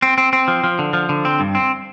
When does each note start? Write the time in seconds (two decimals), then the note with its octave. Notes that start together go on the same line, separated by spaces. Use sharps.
0.02 C4
0.18 C4
0.33 C4
0.48 F3
0.64 F3
0.79 D3
0.93 F3
1.09 D3
1.25 C4
1.40 G2
1.55 C4